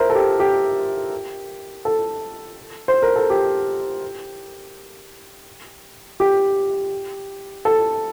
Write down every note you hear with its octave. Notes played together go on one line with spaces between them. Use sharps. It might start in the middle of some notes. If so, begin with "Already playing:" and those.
Already playing: A#4 C5 E5
A4
G4
G4
A4
C5
A#4
A4
G4
G4
A4